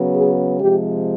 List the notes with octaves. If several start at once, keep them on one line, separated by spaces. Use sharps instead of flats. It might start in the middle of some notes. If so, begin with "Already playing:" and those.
Already playing: C#3 F#3 B3
G#4
C3 F3 G#3 G4